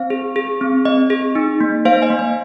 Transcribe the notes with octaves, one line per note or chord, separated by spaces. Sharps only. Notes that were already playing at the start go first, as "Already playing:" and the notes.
Already playing: C4 C5 F5
G#4
G#4
C4
C4 D#5
G#4
D#4
A#3
A#3 C5 F5
D#5 G#5
A#3
D#5